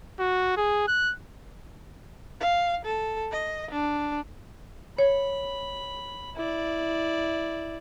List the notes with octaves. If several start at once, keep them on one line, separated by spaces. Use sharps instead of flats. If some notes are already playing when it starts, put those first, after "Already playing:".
F#4
G#4
F#6
F5
A4
D#5
D4
C#5 B5
E4 D5